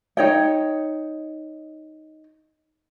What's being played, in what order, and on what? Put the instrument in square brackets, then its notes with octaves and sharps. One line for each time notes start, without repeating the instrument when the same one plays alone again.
[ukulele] D#4 C#5 G5